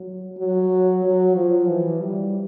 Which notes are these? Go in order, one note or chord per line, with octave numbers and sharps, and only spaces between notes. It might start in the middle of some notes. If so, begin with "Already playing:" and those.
Already playing: F#3
F#3
F#3
F3
E3
G3